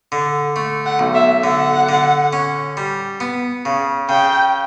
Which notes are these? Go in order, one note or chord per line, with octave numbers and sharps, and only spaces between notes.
D3
A3
F#5
B1
E5
D3 F#5
D3
C#4
G3
B3
C#3
C#3 G5